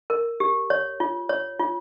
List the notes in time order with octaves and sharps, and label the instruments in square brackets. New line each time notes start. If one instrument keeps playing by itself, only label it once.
[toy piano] A#4
G4
C#5
F4
C#5
F4